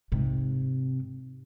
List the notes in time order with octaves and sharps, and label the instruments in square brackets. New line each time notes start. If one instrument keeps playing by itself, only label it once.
[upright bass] G#2 C3